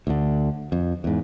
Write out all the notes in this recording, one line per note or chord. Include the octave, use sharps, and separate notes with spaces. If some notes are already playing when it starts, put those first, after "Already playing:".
D2 D3
F2
E2 G#2